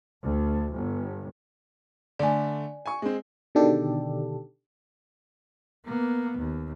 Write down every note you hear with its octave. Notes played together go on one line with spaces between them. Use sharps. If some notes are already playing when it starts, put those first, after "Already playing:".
D2
G1
D3 A3 D5 G#5
G#5 C#6
G#3 C4
B2 D3 D#3 D4 G4 A4
A#3 B3
D#2